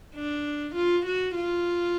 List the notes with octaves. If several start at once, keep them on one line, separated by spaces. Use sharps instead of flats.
D4
F4
F#4
F4